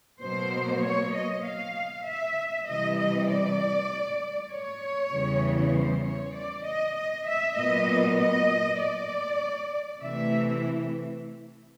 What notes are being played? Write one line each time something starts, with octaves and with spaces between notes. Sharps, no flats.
B2 F#3 A#3 C5
C#5
D#5
F5
E5
C3 E3 G3 D#5
D#5
D5
C#5
E2 C#3 E3 G3
C5
C#5
D5
D#5
D#5
E5
A#2 F#3 B3 D#5
D#5
D5
C3 E3 A3 E5